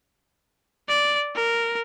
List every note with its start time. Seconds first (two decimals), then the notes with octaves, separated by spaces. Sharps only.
0.88 D5
1.35 A#4